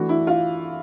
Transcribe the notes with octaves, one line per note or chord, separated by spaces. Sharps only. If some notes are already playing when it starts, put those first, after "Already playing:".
Already playing: E3 A3 D4 F#4
E4
F4